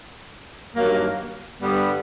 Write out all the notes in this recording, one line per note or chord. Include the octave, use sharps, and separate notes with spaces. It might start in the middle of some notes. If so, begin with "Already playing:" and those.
G2 D#3 F#3 A#3
G2 D3 G3 B3